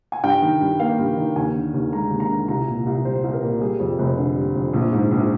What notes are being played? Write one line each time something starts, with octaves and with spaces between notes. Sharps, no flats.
G#5
G2 G5
D#3
G2
A#3 F5
G2
D#3
D#2 G#5
D3
D#2
G#3 A#5
D#2
A#5
D3
C2 A#5
A#2
C2
G3 C5
C2
A#4
A#2
G3 G#4
F2
F1
D3
G3
F2
A#1
G#2
A#1